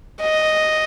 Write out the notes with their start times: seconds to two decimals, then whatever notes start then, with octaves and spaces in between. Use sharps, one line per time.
0.22 D#5